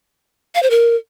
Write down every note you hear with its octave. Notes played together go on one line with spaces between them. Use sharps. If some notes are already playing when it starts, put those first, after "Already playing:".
F5
C5
A#4